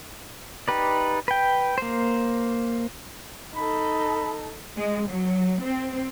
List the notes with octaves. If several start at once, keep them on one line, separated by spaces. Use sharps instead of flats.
D#4 G4 B4 D5
B4 G5
A#3 C5
D#4 A4 B5
G#3
F#3
C4